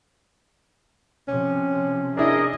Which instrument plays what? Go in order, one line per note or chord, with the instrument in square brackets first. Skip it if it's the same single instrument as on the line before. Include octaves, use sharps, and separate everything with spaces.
[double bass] C3 F3 [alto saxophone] C#4
[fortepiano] D4 E4 [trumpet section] G#4 A#4 D#5